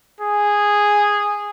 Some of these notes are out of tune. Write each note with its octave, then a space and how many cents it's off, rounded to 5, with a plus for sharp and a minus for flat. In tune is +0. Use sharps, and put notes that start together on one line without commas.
G#4 -10